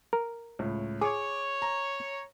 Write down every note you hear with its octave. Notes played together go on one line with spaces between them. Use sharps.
A#4
C#2 A2
G#4 C#5 D6
A#5